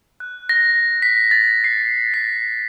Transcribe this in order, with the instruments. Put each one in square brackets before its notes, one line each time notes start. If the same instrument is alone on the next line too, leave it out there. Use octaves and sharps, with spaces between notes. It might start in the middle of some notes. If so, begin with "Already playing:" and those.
[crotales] F#6
A#6
B6
A6
C7
B6